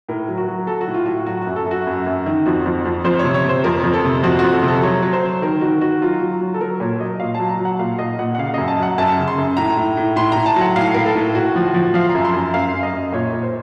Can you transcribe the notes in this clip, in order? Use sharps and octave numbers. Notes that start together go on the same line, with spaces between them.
A2 A#4
F#3
F#4
F#3
F#3 A4
F#4
A2
F4
A2 F#4
F#3 F#4
F#4
F#2
A4
F#2
F#4
F#2
F#2
D#3
F2 F#4
F2
F2
F2 C5
C3 C#5
C#5
C3 C5
F2 A#4
F2
A4
C3
F2 F#4
F2 F#4
A4
C3
A4
F#3 C#5
F#3
C5
F#3
D#3 A#4
D#3 F#4
D#3 F#4
F#3 F4
F#3
F#4
F#3
A4
F#3 A#4
A#2 C#5
F#3 D#5
A#2 F5
A5
F#3
A#5
F#3
F#5
A#2 F5
A#2 D#5
A#2 F#5
F#5
C#3 F5
F#2 D#5
A5
F#3 F#5
F#2 A5
C#3
C6
F#2
A2 A#5
A2
A2
A2 C6
A2 A#5
A5
F#3
F#5
A2 F5
A2 A#4
A4
A2
A2 F#4
F3
F#4
F3
F3 F5
A#5
F#2
C6
F#2
A#5
F#2 F5
F#2
D#5
F#2
A#2 C#5
A#2
C5